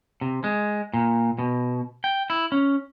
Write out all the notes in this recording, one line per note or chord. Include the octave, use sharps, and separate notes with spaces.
C3
G#3
A#2
B2
G5
E4
C#4